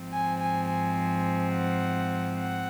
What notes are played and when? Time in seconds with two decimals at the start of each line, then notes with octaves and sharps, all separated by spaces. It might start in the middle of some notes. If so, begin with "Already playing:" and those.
Already playing: G#2 F3 C4
0.11 G#5
0.39 G#5
0.68 G#5
1.52 F#5
2.37 F#5